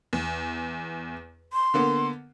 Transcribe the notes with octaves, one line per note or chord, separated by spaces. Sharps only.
E2
C6
D3 A#3 B3